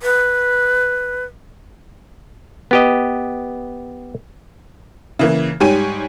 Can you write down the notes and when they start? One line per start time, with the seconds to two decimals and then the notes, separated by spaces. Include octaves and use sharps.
0.02 B4
2.71 B3 G4 D#5
5.19 C#3 E3 A#3
5.60 G#2 G3 G4 C#5 G#5 D#7